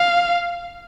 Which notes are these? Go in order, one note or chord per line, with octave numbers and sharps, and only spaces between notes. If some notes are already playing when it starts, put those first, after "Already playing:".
Already playing: F5